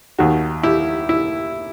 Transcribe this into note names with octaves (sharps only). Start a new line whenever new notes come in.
D#2 D#3 F#4
E4 G4
E4